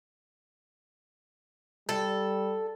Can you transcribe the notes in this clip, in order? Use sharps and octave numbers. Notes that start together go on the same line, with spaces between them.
G3 A4